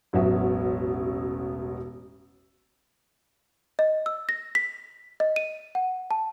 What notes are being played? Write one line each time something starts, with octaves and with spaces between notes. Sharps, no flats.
E1 A1 B2 F#3 E5
D#5
E6
A#6
B6
D#5
D#7
F#5
A5